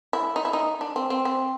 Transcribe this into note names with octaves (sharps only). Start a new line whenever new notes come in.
E4
D#4
E4
D#4
D4
C4
C4
C4